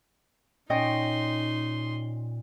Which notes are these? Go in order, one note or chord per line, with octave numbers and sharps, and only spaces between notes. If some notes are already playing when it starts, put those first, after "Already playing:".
A#2 C#4 D#4 D#5 G5 C6